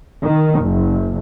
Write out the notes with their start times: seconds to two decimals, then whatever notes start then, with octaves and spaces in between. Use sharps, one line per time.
0.22 D#3
0.61 F#1